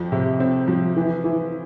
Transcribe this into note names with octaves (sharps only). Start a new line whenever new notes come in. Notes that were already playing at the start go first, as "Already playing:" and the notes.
Already playing: F2 F3
C3
C4
F3
E3
E3